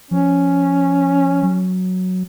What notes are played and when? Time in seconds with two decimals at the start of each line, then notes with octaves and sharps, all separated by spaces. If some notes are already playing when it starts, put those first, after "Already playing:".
0.11 F3 C#4
1.43 F#3